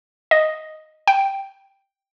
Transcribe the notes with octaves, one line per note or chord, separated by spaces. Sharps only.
D#5
G5